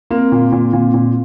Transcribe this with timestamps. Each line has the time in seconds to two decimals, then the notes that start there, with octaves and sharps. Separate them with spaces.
0.10 A#3 C4
0.32 A#2
0.52 A#2
0.73 A#2
0.94 A#2